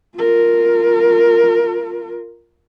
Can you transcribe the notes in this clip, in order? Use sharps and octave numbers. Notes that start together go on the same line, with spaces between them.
F4 A#4